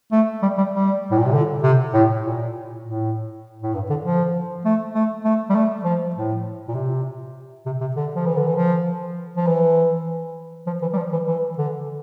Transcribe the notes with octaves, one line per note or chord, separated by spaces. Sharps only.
A3
G3
G3
G3
A2
A#2
C3
D3
C3
A2
A#2
A2
A2
G2
D3
F3
A3
A3
A3
G3
A3
F3
A2
A#2
C3
C3
C3
D3
F3
E3
D3
E3
F3
F3
E3
F3
E3
G3
F3
E3
E3
D3